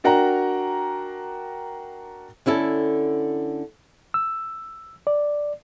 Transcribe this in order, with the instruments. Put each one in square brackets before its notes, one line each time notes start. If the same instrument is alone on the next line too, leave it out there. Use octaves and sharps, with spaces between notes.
[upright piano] D4 F#4 A#4 F#5 G5 A#5
[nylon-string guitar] D3 C#4 E4 A4
[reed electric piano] E6
D5